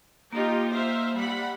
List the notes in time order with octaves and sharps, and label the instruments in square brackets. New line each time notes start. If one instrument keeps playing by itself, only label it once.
[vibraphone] A#3 [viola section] D#4 F4 G4
[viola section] C5 E5 F5
G3 F#5 B5